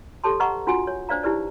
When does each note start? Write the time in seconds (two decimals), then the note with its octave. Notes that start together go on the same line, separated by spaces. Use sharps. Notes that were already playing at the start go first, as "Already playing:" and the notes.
0.24 G4 A4 C#5 A5 C6
0.40 B4 D#5 F#5 A#5 C#6
0.67 D4 F4 F#4 F#5 G#5
0.87 C#5
1.09 D4 C5 D5 F5 A#5
1.23 D#4 E4 G4 B4 D5